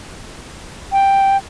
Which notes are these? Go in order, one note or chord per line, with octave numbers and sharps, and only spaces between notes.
G5